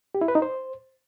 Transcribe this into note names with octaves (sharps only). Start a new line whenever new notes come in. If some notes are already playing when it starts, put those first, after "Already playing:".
G4
E4
B4
D#4
C5